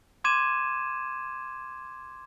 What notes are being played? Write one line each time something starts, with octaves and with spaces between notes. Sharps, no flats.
C6 D6 G#6 D#7 E7